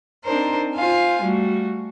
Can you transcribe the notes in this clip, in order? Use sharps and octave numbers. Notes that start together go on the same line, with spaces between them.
C4 D4 D#4 A#4 C5
F4 C5 F5 G#5
G3 A3 F#4